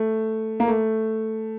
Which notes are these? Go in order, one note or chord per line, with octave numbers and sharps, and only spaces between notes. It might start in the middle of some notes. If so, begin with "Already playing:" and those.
Already playing: A3
A#3
A3